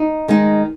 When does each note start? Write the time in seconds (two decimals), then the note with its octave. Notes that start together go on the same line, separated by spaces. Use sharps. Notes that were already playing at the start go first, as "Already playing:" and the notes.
Already playing: D#4
0.28 D#3 G#3 D#4